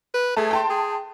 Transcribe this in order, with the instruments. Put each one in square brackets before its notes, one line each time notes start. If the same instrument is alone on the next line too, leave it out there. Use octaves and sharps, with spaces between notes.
[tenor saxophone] B4
[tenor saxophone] A3 [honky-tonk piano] G#4 A5
[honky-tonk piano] G5 A5 C6
[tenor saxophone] G#4